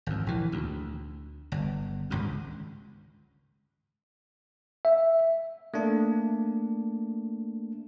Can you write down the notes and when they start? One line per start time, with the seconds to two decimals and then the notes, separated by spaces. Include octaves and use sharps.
0.07 G#1 F2
0.27 A#1 E3
0.52 D2
1.52 G1
2.10 G#1 C#2 G2
4.85 E5
5.74 A3 A#3 D4